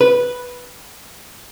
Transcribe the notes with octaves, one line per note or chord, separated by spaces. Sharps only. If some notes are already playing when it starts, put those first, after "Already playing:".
B4